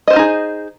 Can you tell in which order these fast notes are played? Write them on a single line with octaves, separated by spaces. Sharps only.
D#5 C5 F4 D#4 G#4